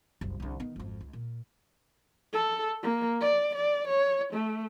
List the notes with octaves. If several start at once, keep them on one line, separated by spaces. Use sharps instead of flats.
F#1 C2
C2 D3
D#3 B3
G#1 F2
C#2
A#2
A4
A#3
D5
D5
C#5
A3